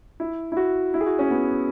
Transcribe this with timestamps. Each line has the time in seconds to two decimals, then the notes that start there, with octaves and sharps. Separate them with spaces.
0.20 E4
0.52 E4
0.57 F#4
0.94 E4
1.01 G#4
1.06 F#4
1.19 C#4
1.30 B3